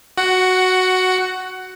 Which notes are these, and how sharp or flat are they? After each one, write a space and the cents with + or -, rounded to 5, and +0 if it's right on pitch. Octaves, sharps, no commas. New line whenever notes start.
F#4 +0 F#5 +15